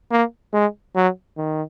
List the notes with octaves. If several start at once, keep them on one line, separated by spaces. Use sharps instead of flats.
A#3
G#3
F#3
D#3